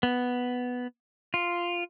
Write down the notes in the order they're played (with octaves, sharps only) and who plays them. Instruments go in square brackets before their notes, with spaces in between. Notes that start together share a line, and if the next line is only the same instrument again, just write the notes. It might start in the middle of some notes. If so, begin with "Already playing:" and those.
[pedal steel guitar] B3
F4